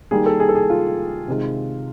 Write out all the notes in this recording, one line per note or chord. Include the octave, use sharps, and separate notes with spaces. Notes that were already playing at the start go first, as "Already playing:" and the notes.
D#3 G3 A#3 G#4
A4
G#4
A4
G#4
F4
C3 D#3 G#3